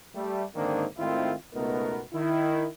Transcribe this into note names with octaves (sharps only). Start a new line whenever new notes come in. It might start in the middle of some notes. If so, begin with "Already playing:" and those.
G3 A3
G#2 D3 D#3 A#3 C4 D4
G#1 D#3 A3 C4 E4 F4
C#2 B2 A3 B3 D#4 A#4
D#3 E4